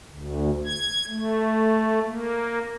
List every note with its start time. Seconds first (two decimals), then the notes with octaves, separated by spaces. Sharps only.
0.11 D2
0.65 G#6
1.08 A3
2.05 A#3